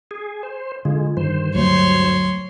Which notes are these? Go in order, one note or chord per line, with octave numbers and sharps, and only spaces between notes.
G#4
C5
D3 G#3 F4
G2 D#3 C5
D2 F#3 A3 C#5 C6